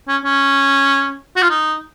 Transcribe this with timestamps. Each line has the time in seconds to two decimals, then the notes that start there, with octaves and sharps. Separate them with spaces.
0.08 C#4
0.25 C#4
1.36 F#4
1.42 F4
1.50 D#4